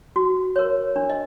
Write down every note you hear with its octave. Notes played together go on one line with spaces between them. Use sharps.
F#4
A#4 C#5
D4
D#5